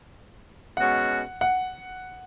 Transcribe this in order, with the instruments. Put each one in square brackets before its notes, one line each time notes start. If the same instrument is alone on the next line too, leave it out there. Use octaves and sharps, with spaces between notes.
[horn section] B2 G#3 C#4 F#4 [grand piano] F#5
[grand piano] F#5